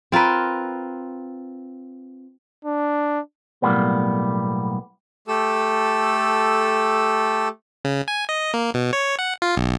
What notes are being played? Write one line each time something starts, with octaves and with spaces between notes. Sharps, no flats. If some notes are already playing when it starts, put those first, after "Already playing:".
C4 F4 A#4 B4
D4
B1 F2 A2 G3 A#3 B3
A3 G4 A4 E6
C#3
G#5
D#5
A#3
B2
C#5
F#5
F4
B1